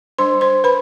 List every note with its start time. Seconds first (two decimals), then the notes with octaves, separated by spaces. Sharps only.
0.19 G3 D4 C5 C6
0.41 C5 C6
0.64 B4 B5